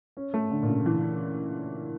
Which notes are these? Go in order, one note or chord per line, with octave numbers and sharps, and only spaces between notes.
C#4
A3
D3
A#2
C#3
E3